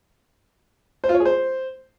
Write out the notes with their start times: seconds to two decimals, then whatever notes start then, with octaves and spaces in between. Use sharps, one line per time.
1.04 C5
1.09 F4
1.15 C#5
1.20 G#4
1.25 C5